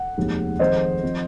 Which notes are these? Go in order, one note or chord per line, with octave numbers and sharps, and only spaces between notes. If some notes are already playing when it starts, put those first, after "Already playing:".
Already playing: F#5
F1 D#2 D#3 G#3
F2 D#3 G#3 C5 D#5
F3 C4